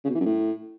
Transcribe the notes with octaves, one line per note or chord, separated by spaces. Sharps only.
C#3
B2
E3
F#2
A2